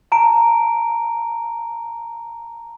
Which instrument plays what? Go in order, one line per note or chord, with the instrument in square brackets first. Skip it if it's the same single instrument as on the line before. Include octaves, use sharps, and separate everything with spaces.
[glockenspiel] A5 A#5 D7